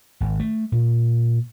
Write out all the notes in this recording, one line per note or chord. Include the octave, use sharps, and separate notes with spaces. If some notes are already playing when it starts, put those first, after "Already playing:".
G#1
A3
A#2